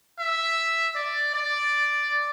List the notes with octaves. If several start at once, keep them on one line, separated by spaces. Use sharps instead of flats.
E5
D5
D5